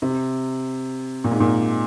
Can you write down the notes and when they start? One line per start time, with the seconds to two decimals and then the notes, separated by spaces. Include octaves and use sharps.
0.02 C3
1.24 A#2
1.32 G#2
1.40 A#2